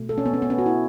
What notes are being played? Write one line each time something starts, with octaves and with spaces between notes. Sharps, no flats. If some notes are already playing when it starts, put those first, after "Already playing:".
Already playing: B2 A3
A4
C#4
B3
C#4
B3
C#4
F#4
E4